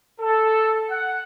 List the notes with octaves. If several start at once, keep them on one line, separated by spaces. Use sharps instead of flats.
A4
F#5